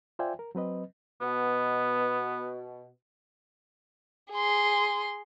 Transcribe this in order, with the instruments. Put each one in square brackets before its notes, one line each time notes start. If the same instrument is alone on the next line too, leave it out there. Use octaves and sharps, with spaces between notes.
[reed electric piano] F4 C5 D5 E5 G5 G#5
A#4
F#3 C4 B4 D#5
[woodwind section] B2 [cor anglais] B3
[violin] G#4 C6